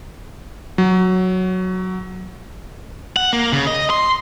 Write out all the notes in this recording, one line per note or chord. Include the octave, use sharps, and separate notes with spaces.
F#3
F#5
A#3
C#3
D#5
C6